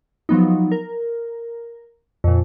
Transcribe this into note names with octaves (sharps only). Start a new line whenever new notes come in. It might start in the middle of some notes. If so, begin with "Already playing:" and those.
F3 F#3 B3 D#4
A#4
F2 A#2